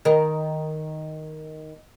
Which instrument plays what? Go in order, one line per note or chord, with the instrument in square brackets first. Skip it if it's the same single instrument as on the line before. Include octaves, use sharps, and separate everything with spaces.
[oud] D#3 A#4